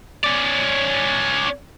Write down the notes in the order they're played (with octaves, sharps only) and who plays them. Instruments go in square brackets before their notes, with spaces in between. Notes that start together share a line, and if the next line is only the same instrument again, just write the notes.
[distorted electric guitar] C#4 D5